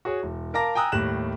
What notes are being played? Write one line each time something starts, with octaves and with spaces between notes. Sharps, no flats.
F#4 G#4 C#5
E1
A#4 F5 A5 A#5 D6 A#6
G5 G#5 A#5 D#6 E6 F#6
D#2 A2 G3 F#6 E7